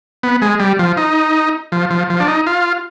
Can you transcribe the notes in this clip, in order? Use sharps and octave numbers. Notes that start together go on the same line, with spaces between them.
B3
G#3
G3
F3
D#4
F3
F3
F3
D4
D#4
F4